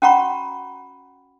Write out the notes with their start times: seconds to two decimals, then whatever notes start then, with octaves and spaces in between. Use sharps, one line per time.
0.02 C#4 F#4 F#5 A#5 B5 C#6